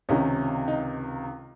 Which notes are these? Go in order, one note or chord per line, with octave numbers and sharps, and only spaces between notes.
C#2 C3 D#3 C#4
D#4